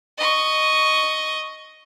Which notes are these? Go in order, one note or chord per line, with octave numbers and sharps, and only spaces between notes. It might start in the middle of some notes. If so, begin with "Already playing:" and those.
D#5 C#6